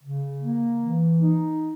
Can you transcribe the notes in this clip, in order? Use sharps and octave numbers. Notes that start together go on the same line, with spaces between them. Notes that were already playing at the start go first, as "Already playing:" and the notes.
C#3
A#3
E3
D#4